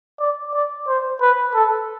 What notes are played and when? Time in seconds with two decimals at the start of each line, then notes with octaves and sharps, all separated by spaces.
0.20 D5
0.54 D5
0.88 C5
1.21 B4
1.54 A4